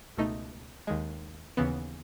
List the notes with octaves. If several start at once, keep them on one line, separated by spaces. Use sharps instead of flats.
C#2 B2 A3 D#4
D#2 D#3 G#3
D#2 C#3 E3 B3